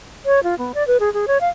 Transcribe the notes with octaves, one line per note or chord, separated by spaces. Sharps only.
C#5
F4
B3
D5
B4
G#4
G#4
C#5
F5